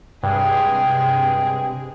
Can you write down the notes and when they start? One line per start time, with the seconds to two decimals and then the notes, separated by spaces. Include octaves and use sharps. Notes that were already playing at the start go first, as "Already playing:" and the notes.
0.23 G2 C3 G#3 G#4 G5